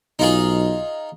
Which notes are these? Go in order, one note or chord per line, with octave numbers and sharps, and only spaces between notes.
B1 D#4 F4 G#4